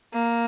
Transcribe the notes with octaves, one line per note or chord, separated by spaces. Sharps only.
A#3